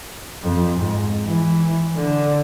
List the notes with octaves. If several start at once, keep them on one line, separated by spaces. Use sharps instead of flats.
F2
G#2
E3
D3